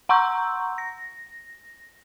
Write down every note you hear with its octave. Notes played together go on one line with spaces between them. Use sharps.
F#5 A#5 C6 C#6 E6 G6
A#6